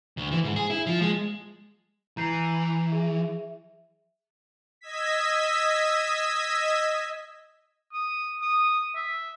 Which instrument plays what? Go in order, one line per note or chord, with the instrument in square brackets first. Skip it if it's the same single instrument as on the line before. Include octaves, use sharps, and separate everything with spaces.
[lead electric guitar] D2
E3
G#2
G#4
E4
F3
G#3
[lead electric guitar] E3 [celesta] A#5 G6 C7
[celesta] G#4 E5
[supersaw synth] D#5 E6 G#6 B6
[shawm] D#6
D#6
E5